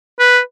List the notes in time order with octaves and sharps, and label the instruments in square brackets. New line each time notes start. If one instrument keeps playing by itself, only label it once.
[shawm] B4